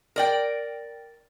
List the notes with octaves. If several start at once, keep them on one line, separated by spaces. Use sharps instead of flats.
A#4 D5 G5